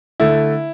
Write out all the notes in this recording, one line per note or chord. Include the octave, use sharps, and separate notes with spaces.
D3 A3 E4